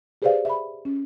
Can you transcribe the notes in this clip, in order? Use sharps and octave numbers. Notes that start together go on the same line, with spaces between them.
G4 G#4 B4 C5 D5 F5
E5 B5
C#4